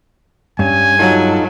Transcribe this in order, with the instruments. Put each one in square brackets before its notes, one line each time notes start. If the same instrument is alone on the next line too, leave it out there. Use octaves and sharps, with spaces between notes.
[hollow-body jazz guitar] G2 [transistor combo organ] C#4 [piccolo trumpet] G#5
[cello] F#3 [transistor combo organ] D#4 F4 A4